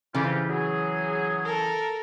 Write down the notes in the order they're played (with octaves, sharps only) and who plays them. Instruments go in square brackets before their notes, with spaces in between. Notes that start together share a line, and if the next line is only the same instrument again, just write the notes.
[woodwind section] F2 F4 G4 [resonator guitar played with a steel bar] C#3 E3
[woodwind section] F#3 G#4
[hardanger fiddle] A4 A#4